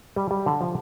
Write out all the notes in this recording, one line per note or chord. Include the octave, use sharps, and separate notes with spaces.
G3
G3
D3
F3